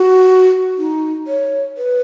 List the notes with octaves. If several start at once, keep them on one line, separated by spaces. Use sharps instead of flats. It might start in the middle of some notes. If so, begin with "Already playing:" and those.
Already playing: F#4
D#4
C#5
B4